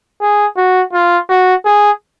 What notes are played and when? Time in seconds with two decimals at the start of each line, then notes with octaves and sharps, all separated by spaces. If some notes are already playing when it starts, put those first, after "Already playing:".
0.21 G#4
0.57 F#4
0.93 F4
1.29 F#4
1.65 G#4